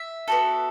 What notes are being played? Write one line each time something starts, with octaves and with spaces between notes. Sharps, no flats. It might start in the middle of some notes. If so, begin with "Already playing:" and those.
Already playing: E5
B3 F#4 A4